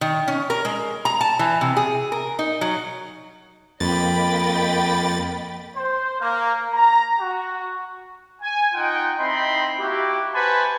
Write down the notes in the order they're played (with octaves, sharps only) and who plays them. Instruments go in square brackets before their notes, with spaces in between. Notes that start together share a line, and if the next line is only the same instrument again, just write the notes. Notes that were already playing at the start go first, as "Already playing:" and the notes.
[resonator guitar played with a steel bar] D#3
C#4
A#4
G#3
A#5
A5
E3
C3
G#4
A#4
D#4
F#3
[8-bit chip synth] F2 A6 [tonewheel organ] A#3 [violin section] D#5 G5 B5
[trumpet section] C5
A#3
A#5
F#4
G#5
D#4 F4 F#5 G5
C4 D#4 E4 B5 C6
A#3 E4 F#4 G4
B4 C5 F#5 G#5 A5 B5